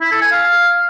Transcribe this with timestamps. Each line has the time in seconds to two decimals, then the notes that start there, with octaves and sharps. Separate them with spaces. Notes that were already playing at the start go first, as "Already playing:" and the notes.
0.01 E4
0.11 A4
0.21 G#5
0.32 F5